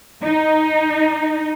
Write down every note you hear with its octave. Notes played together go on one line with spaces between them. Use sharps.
D#4